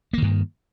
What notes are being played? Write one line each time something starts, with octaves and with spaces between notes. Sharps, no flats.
G2 D#3 A#3